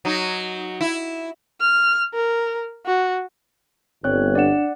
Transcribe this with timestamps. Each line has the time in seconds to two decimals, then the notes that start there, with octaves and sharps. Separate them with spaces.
0.05 F#3 D#4
0.81 E4
1.61 F6
2.13 A#4
2.86 F#4
4.04 G1 C4 C#5 F#6
4.35 D4 D5 F#5 E7